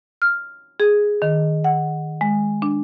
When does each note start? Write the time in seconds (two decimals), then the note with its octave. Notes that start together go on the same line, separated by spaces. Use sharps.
0.22 F6
0.80 G#4
1.22 D#3
1.64 F#5
2.21 G#3
2.62 D4